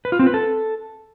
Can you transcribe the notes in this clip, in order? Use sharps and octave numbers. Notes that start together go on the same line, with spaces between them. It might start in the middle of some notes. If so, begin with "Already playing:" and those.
B4
F4
C4
B4
A4